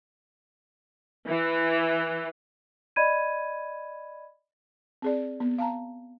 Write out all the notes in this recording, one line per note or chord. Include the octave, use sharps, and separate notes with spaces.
E3
D5 D#5 B5 G#6 D#7
C4 G#4 D5
B3
F5 A5 A#5